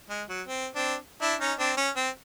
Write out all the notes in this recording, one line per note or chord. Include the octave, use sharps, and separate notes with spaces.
G#3
F#3
C4
C4 D4
D4 E4
C#4 D#4
C4 D4
C#4
C4